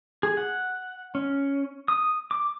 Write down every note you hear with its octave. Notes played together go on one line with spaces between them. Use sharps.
G#4
F#5
C#4
D#6
D6